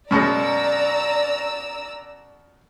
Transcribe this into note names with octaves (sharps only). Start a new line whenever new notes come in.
F#2 B2 G#3 D5 A#5 E6